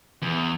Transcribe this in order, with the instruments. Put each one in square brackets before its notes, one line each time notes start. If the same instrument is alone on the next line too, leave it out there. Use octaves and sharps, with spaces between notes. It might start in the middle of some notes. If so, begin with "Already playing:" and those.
[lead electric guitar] E2